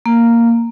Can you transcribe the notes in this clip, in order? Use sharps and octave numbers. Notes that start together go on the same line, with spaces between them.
A#3